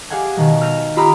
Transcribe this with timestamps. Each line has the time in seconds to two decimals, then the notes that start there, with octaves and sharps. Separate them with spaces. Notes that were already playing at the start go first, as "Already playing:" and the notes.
0.10 G4 G#4 F5 F#5 G#5
0.37 B2 D#3 G#3
0.61 F6 G6 A#6 D#7
0.97 F4 G4 A#5 B5 D#6 F6